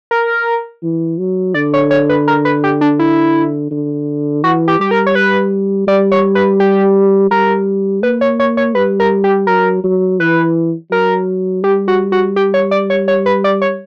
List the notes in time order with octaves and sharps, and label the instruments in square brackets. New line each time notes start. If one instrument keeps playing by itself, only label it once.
[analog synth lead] A#4
[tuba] E3
F#3
[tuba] D3 [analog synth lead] D5
[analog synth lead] C#5
C#5
B4
A#4
B4
G4
D4
E4
[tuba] D3
[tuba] E3 [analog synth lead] F#4
[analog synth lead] G4
[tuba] G3 [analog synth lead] G4
[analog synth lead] A#4
C#5
B4
[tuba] G3 [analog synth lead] D5
[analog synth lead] C#5
B4
G4
[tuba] G3 [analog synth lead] A#4
[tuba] A#3 [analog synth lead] B4
[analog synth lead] C#5
C#5
C#5
[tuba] G3 [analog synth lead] B4
[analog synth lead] A#4
G4
[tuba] F#3 [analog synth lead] A#4
[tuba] F#3
[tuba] E3 [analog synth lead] B4
[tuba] F#3 [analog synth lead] A#4
[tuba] G3 [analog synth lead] G4
[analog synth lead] F#4
F#4
G4
C#5
D5
C#5
C#5
B4
D5
C#5